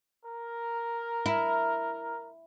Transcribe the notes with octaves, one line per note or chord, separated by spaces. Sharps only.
A#4
E4